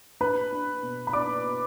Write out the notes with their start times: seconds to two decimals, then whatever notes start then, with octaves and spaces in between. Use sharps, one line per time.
0.21 D4 B4 B5
0.52 D4
0.83 B2
1.07 B5
1.13 D4 D5 D6
1.44 B2